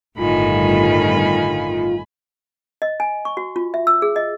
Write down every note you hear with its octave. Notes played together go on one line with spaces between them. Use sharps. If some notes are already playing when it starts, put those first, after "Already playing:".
G1 A2 D#3 F4 G#5 B5
D#5
G#5
C#6
F#4
F4
E5
E6
G#4
D#5